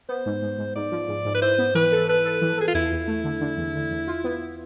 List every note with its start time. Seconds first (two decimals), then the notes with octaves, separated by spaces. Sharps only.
0.09 B3 C5
0.26 G#2
0.42 G#2
0.59 G#2
0.76 G#2 D5
0.92 F3
1.08 G#2
1.25 G#2
1.35 B4
1.41 E4 C5
1.58 B3
1.75 E3 B4
1.92 A4
2.08 A4 B4
2.25 A4
2.42 E3
2.58 G#4 A4
2.67 F4
2.74 E2 E4
2.92 E2
3.08 A3
3.24 D3
3.41 D3
3.58 E2
3.75 D3
3.91 E2
4.07 F4
4.24 B3